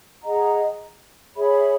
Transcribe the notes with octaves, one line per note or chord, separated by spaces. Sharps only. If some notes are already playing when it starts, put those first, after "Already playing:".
G#4 D#5 F#5 A#5
G#4 C#5 E5 B5